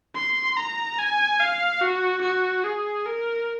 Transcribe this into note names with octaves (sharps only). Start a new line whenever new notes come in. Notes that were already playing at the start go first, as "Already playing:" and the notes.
C6
A#5
G#5
F5
F#4
F#4
G#4
A#4